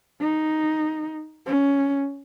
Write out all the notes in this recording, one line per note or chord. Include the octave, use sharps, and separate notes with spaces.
D#4
C#4